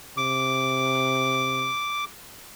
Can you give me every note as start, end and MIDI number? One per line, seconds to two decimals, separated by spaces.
0.17 1.72 48
0.17 2.05 86